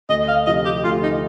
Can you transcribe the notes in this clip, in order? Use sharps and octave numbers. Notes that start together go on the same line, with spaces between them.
D2 D#5
F5
C3 F3 D#5
G4
D2 F4
D#4